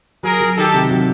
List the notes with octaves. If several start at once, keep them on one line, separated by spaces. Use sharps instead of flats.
F#3 G#4 A#4
F#3
D#3 G4 A4
C3
F#3